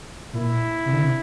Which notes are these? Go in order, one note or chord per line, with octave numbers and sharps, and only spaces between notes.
A#2 E4
C3
D3
C3